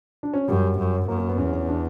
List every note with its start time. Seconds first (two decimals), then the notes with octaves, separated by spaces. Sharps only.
0.23 D4
0.34 C#4
0.48 F#2 G3
0.78 F#2
1.08 F#2 A#3
1.18 A#3
1.29 B3
1.38 E2 C#4
1.53 C#4
1.68 D4